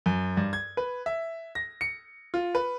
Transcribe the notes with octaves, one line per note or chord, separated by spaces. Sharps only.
F#2
G2
G#6
B4
E5
A#6
C#7
F4
B4